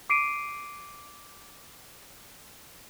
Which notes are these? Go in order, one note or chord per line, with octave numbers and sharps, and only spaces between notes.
D6 C7 D7 D#7